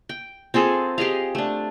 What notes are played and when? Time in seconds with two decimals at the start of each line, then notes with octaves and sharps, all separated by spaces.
0.09 G5
0.54 C4 F4 G#4 A4
0.98 G4 G#4 D#5 F5
1.35 A3 D4